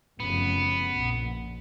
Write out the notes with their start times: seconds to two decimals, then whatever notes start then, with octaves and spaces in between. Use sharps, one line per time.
0.20 F1 F#2 C#3 B3
0.92 A#1 A#2